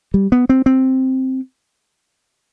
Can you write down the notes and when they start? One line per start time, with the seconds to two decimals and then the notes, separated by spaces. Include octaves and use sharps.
0.14 G3
0.32 B3
0.49 C4
0.66 C4